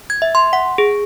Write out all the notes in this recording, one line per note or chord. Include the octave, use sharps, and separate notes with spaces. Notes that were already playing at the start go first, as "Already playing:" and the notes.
G#6
E5
C6
F#5
G#4